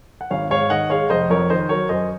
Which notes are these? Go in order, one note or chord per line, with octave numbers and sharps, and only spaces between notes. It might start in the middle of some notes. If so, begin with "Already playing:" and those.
F#5
G#1 C#5 F5
G#2 C#5 F5
D#3 D#5 F#5
G#3 C#5 F5
F1 C5 D#5
F2 A#4 C#5
D#3 C5 D#5
F#3 A#4 C#5
F#2 C5 D#5